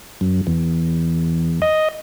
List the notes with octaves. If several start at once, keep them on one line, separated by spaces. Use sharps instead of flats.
F#2
E2
D#5